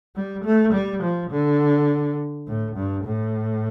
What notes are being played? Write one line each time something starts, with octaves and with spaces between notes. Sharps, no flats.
G3
A3
G3
F3
D3
A2
G2
A2